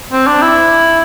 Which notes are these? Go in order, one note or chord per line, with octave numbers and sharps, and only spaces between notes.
C4
D4
E4